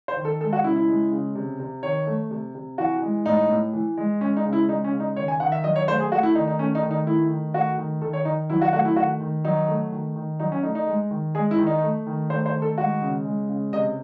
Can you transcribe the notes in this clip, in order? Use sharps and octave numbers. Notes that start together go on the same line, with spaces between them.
C5
D#3
A4
G#3 A4
F#4
C#3 E4
E4
G#3
C#3
C3
C3
D#3 C#5
A3
C3
C3
E3 F#4
G#3
A2 D#4
A2
E3
G#3
G#3 C#4
D#4
C#3
E4
G#3 D#4
C#4
C#3
D#4
D#3 C#5
G#5
D#3 F#5
E5
F#3 D#5
C#5
A3 C5
G#4
A3 F#4
E4
D#3 D#4
D#4
A3 C#4
D#4
D#3
D#4
A3 E4
D#3
A3 F#4
D#3
D#3 A4
C#5
D#3 D#4
F#3 E4
F#4
A3 F#4
E4
D#3 F#4
D#3
F#3 D#4
A3
D#3
D#3
F#3 D#4
C#4
A3 D#4
D#4
G#3
D#3
G#3 G#4
E4
D#3
D#4
A3
D#3
A3 C5
C5
D#3
A4
G#3 F#4
C#3
G#3
C#3
C3 D#5